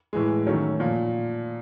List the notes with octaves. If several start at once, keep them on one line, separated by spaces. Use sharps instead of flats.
A2 E3 G#3
D#3 F#3 A3 C#4
A#2 F3